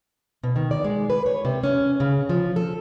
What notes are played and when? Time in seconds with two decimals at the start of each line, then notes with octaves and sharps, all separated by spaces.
0.43 B2
0.56 D#3
0.71 D5
0.84 G#3
1.10 B4
1.26 C#5
1.45 C3
1.64 C#4
2.00 C#3
2.29 F3
2.56 A4